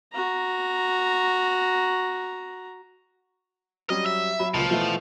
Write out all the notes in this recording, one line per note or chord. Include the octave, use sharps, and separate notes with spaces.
F#4 A#5
F#3 G3 C#4 D#5
E5
F#3 B5
C#2 A#2 F3
B2 E3 A3